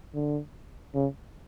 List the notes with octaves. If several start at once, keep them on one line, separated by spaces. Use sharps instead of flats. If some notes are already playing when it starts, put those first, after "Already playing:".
D3
C#3